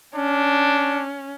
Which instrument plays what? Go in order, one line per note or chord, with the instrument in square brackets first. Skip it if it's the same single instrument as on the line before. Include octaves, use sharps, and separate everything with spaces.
[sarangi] C#4 [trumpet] D4